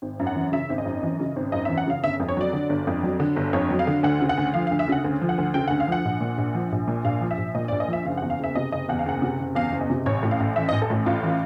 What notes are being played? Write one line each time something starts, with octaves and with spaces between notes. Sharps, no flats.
G#1
F#2
F#5
E3
C#3 E5
G#1
D#5
F#2
E3
C#3
G#1
F#2 D#5
E3 E5
F#5
C#3 F5
G1 E5
F2
C#5
F#3 D5
D3
G1
F2
F#3
D3
G1
F2 C#5
F#3
F5
D3
D2 F#5
C#3
F#5
D2
F3 F5
F5
D2
E5
C#3 F#5
D2
F3
F#5
D2
C#3 G5
D2 F#5
F5
F3 F#5
A#1
A#2
A#1
F3
A#1
A#2
A#1 F5
F3
E5
A#1
A#2 D#5
A#1 D5
D#5
F3 E5
F#1 F5
F#5
E2
F5
F#1 E5
C3 D#5
F#1 D#5
E2 F#5
F5
F#1 F#5
C3
F#1
E2 F5
F#1
D#5
C3
A1 C#5
A2
F5
A1
E3 E5
D#5
A1
A4
A2
A1 F4
E3